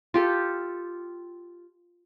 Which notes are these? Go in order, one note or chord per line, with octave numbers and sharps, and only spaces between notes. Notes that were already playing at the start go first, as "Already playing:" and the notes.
F4 G4 A4